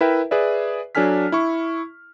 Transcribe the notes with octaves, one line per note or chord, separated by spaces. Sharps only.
E4 A#4 B4 E5 G5
G#4 B4 D5 E5
F#3 D4 A4 G#5 F6 B6
E4 C#6